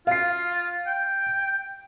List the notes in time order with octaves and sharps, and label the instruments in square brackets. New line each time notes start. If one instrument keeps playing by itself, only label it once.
[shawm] F4 [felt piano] F5 C7
[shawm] G5